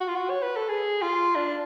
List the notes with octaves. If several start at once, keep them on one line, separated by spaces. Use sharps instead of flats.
F#4
F4
F#4
C#5
B4
A4
G#4
F4
D4